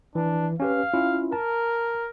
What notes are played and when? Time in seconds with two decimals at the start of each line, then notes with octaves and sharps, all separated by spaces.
0.15 E3 D4
0.60 C#4 G4 B4 F5
0.94 C#4 E4 F4
1.33 A#4 A5